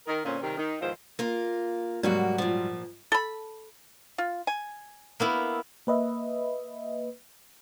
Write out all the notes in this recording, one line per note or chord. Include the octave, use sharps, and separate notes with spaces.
D#3 A#4
A#2 D3 C4 C#4
C3 D#3 G3 C4 A#4
D#3 D#4
E2 G#2 D#3 F3 F4 C5
A#3 F4
G#2 C3 F#3 G3 A#3 F#4
A#2 F3
A4 B5
F4
G#5
A#3 B3 E4
A#3 B4 D#5 E5